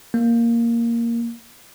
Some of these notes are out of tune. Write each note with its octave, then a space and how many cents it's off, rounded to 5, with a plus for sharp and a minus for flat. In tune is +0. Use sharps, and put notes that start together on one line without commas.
A#3 +0